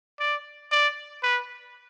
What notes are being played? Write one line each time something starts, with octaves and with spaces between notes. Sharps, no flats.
D5
D5
B4